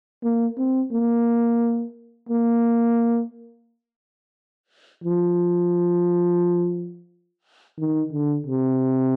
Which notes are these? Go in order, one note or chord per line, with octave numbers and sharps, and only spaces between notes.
A#3
C4
A#3
A#3
F3
D#3
D3
C3